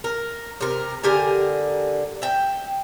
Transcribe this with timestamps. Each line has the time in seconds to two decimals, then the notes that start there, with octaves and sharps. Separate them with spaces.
0.04 A#4
0.61 C3 A#4
1.03 D3 G4 A#4 G#5
2.22 E5 G5